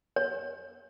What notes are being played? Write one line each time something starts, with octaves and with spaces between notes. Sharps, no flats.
C#5